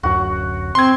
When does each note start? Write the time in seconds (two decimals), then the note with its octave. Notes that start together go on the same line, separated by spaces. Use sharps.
0.03 D1 F#2 F#4
0.75 C4 C6 G#6